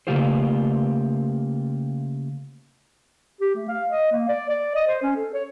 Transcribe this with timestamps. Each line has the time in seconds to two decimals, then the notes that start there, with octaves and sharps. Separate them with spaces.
0.07 C#3 A3 A#3 F4 G4 C5
3.41 G4
3.55 A3
3.69 F5
3.89 D#5
4.12 A#3
4.29 D5
4.49 D5
4.75 D#5
4.87 C5
5.02 C#4
5.16 A4
5.34 C#5